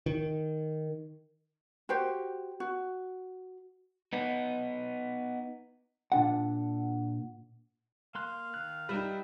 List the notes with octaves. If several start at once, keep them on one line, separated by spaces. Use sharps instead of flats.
D#3
F#4 G4 C5
F#4
B3 D#4
A#2 D4 F#5
A#3 F5 C6 F#6
D#3 F#6
G3 D#4 B4 E5 G5